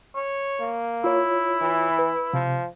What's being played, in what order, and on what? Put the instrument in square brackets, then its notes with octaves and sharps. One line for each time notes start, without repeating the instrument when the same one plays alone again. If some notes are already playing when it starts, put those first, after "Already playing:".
[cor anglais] C#5
[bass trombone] A#3
[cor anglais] E4 [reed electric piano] F4 C#5
[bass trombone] E3
[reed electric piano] B4
[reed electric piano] C3 [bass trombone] F3